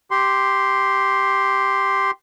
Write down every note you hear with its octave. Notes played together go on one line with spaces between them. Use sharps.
G4 C6